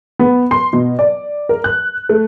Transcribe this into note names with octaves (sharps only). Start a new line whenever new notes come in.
B3
C6
B2
D5
A#4
F#6
A3